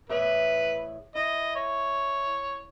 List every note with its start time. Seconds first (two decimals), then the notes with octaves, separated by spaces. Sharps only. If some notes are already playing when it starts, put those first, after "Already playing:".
0.09 E2 A2 B4 E5
1.15 E4 D#5
1.56 C#5